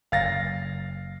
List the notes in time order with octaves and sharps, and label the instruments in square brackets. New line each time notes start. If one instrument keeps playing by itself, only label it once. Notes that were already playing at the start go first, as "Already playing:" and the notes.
[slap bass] F#1 [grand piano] F5 A6 A#6